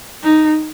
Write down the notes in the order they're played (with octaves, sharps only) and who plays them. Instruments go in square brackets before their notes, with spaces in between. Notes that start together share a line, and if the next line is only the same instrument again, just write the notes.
[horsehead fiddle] D#4